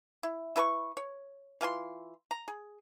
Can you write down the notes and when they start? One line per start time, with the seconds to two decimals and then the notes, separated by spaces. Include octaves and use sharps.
0.23 E4
0.56 E4 B4 A5 C#6
0.97 C#5
1.61 E3 F4 G#5 C6
2.31 A#5
2.48 G#4